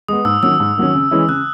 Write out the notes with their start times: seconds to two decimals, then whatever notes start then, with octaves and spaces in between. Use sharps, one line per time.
0.08 G#3 B3 D#6
0.25 G#2 E6
0.42 D#3 F#3 C#4 E6
0.60 G#2
0.77 D#3 F#3 C#4
0.95 C#3
1.11 E3 G#3 C#4 E4
1.29 C#3 F#6